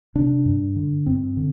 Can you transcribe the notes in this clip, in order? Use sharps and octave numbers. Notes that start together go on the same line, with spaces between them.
C3 D4
G2
D3
G2 C4
D3